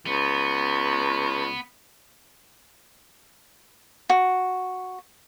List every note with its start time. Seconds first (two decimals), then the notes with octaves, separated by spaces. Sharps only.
0.07 C#2 B3
4.10 F#4